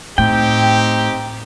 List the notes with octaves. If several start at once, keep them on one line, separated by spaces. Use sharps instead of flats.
A2 C4 D#4 G4 G5